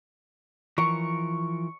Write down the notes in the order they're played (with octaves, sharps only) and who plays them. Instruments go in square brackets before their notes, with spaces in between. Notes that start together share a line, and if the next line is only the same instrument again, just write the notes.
[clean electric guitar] E3 F3 A#4 [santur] C#6